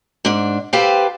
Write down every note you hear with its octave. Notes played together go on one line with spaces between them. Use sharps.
G#2 D4
G4 A4 B4 C5 F5 G5